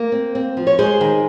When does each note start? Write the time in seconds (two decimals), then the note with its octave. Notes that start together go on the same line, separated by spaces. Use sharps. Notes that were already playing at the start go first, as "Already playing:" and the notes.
Already playing: A#3
0.12 C4
0.35 C4
0.57 F3
0.67 C#5
0.79 G#3 G#4 C5
1.01 D#3